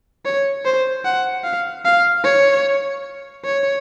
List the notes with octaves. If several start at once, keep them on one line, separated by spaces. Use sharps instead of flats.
C#5
C5
F#5
F5
F5
C#5
C#5